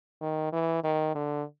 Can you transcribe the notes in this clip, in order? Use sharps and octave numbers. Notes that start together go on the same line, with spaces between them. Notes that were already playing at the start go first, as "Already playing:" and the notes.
D#3
E3
D#3
D3